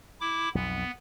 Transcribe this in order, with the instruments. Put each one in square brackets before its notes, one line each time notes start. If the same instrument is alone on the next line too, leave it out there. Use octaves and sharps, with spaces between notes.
[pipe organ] E4 D6
[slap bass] B1 F2 [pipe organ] B3